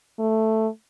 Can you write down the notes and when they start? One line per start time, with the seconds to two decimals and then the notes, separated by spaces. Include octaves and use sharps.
0.19 A3